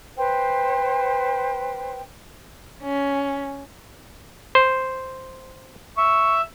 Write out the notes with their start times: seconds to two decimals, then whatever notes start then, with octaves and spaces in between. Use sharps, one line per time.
0.18 B4 C5 G5 C6
2.83 C#4
4.55 C5
5.97 E5 C#6